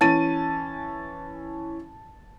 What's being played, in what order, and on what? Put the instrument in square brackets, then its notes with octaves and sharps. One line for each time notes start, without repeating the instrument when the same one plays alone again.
[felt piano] E3 C#4 D#7 [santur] A5